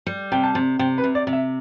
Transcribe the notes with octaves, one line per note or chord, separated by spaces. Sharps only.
G3
C3 G5
A5
C3
C3 G5
B4
C3
D5
C3
E5